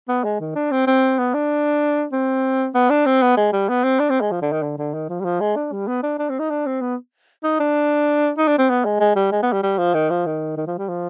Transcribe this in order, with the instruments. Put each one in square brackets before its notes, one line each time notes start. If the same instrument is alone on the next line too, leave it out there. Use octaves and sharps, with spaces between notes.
[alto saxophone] B3
G#3
D#3
D4
C4
C4
B3
D4
C4
B3
D4
C4
B3
G#3
G3
B3
C4
D4
C4
G#3
F3
D3
D#3
D3
D3
D#3
F3
G3
F3
G#3
D4
G3
B3
D4
D4
C4
D#4
D4
C4
B3
D#4
D4
D#4
D4
C4
B3
G#3
G#3
G3
G#3
B3
G3
G3
F3
D#3
F3
D#3
D#3
F3
G3
F3